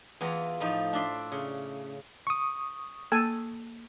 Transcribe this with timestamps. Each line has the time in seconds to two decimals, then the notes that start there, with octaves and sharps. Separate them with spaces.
0.21 E2 E3 F4 A#5
0.60 A2 F3 D#4
0.93 D4 D5 E5 C6
1.32 C#3
2.27 C#6 D#6
3.12 A#3 A4 G#5